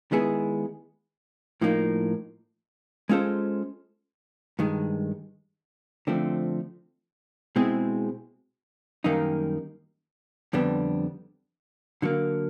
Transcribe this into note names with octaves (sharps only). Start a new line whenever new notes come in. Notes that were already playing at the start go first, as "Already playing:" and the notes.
D#3 G#3 B3 E4 G#4
A2 F3 A#3 D#4
G#3 C#4 F4 A4 C5
G2 D#3 G#3
D3 F3 A3 C4
B2 G#3 C4 E4 G#4
F#2 D#3 G3 A#3 D#4
F2 D3 G3 B3 D4
D3 F#3 A#3